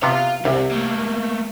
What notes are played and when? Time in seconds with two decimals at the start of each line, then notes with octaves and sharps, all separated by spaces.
0.03 C3 B3 F5 C6
0.45 C2 C3
0.71 A3 A#3